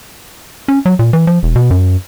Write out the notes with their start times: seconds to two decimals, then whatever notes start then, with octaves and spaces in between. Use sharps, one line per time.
0.68 C#4
0.86 F#3
0.99 A#2
1.13 E3
1.27 F3
1.43 E1
1.56 B2
1.71 F#2